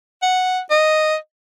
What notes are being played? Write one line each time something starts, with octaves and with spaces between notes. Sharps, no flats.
F#5
D#5